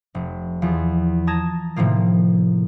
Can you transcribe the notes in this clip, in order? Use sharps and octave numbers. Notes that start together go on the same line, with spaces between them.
F1
E2 F3
A5 A#5 D#6 G#6 A#6 E7
A2 C3 D#3 F3 A#3